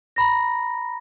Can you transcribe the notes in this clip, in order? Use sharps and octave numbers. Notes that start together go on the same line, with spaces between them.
A#5 B5 A#6